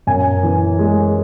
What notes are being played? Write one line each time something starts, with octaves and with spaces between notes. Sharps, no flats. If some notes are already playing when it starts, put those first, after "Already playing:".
F#2 G#5
E3
G#3